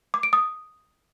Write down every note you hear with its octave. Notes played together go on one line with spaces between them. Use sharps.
D6
D7
D#6